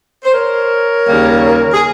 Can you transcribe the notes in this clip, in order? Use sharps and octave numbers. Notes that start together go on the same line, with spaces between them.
C5
A#4 C#5
D#2 C#3 G3 A#3
G#4